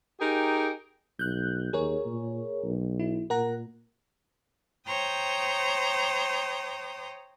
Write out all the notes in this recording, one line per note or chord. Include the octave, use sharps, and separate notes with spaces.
D#4 G4 G#4 A#4 G5
B1 F#6 G6
D#2 G#4 A#4 C#5
A#2
B1
E4
A#2 A#4 F#5 A#5
C5 C#5 G5 A#5 D#6